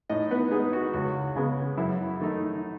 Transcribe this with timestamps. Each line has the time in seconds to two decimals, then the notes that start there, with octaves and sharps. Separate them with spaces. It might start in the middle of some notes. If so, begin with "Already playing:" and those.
0.10 A2 D#4 D#5
0.31 B3 B4
0.51 G#3 B3 D#4 G#4
0.73 F#4
0.93 C#2 F#4
1.36 C#3 G#3 B3
1.77 F#2 E4
2.20 D#3 A3 D#4